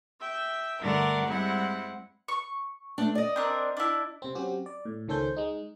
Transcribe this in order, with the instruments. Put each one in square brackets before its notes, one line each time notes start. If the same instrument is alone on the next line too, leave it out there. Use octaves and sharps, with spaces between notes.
[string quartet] E5 G5
G2 D3 A3 A#4 D5 F#5
G3 G#3 C4 E4 F#5
[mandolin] C#6
[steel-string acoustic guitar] A3 D4
D5 D#5
[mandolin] C4 D4 A#4
D4 E4
[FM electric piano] C3 C4
F#3 C4 C#4 F#4 G4
D5
A2
C#2 D#3 C#4 A4 C5 G6
G#3 D#4